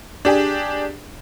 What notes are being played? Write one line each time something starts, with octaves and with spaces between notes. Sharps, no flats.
D4 G4 G#4